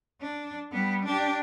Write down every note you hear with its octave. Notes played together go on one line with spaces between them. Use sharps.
D4
G3 B3
D4 G4